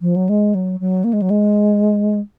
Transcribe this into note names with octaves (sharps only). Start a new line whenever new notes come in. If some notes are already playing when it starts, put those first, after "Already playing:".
F3
F#3
G#3
F#3
F#3
A#3
G#3
F#3
G#3